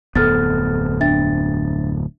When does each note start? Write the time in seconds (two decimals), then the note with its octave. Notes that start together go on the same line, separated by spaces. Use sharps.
0.15 D1 F2 B3 A4 F6 A6
1.01 D4 E5 A6